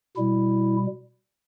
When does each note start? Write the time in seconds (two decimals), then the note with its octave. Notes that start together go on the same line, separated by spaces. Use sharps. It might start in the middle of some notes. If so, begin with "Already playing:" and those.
0.16 B2 G3 E4